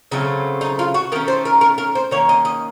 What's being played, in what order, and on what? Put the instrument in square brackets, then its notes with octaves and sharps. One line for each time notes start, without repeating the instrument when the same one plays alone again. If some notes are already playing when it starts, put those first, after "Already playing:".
[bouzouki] C#3 F#3 A3 C4 D#4
D#4
F4
F#4
D#3 A3 C#4 A#4
C5
A#4
A#4
A#4
C5
D#3 A#3 C#4 C#5
D#5
D#5